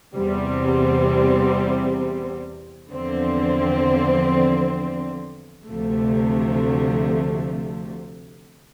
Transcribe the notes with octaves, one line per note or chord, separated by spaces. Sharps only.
E2 C3 G3 C4
E2 D3 F3 C4
D2 C3 F3 A3